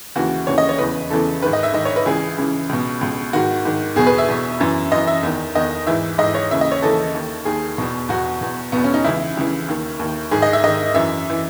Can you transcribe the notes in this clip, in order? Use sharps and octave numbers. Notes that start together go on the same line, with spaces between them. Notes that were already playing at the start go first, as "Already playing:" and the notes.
D#2 C#3 E3 F#4
D#2 C#3 E3 C#5
D#5
C#5
E2 C#3 E3 B4
E2 C#3 E3 A4
G#2 D#3 B4
D#5
E5
G#2 D#3 D#5
C#5
B4
C#2 C#3 E3 G#4
C#2 C#3 E3
C#2 B2
C#2 B2
G#2 D#3 F#4
G#2 D#3
E2 B2 G#4
B4
E5
E2 B2
F#2 E3
F#2 E3 D#5
E5
E2 D#3
E2 D#3 D#5
G#2 E3 E5
G#2 D#5
E3
C#5
D#2 C#3 E3 E5
D#5
C#5
D#2 C#3 E3 A4
D#2 D#3
D#2 D#3 G#4
E2 B2
E2 B2 F#4
E2 B2
E2 B2 B3
C#4
D#4
C#2 C#3 E3 E4
C#2 C#3 E3
D#2 D#3
D#2 D#3
G#2 D#3 G#4
D#5
E5
G#2 D#3 D#5
F#2 E3 E5
E3